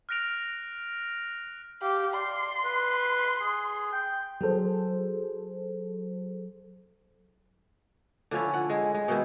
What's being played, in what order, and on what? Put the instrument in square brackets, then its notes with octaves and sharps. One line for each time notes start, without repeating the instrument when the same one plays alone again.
[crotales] F6 F#6 A#6 D7 F7
[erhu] G4 [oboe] F5
[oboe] D5 [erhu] C6
[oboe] B4
G#4
G5
[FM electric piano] F#3 G#4 A4 C5
[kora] D3 F3 C#4 E4
F#5
G#3
G#3
B2 D#3 E4